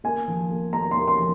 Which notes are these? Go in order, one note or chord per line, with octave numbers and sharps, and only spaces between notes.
A#3 G#5
F3
A#3
A#3 A#5
A#3 C6
C6
F3